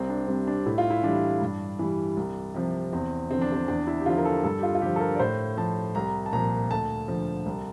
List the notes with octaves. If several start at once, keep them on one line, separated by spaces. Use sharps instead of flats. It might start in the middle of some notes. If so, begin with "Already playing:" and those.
Already playing: C2 C4
D4
C3 G3 C4
D4
A2 E4
F4
E4
E3 G3 D4
G2
E3 G3
C2
C3 F3
E2 C4
D3 F3 C4
D4
C4
E2 D4
E4
G4
D3 F3 F4
A#4
A4
G2 A4
G4
F4
F4
D3 F3 G4
A4
A#4
D5
A2 C5
F3 A5
C2 A#5
A5
A#2 F3 A#5
D2 A5
D3 F3
C2